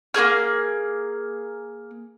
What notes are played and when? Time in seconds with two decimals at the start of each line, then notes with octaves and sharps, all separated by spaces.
0.14 A#3 F4 G#4 F6